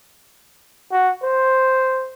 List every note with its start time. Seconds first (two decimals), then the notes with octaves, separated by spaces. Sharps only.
0.92 F#4
1.23 C5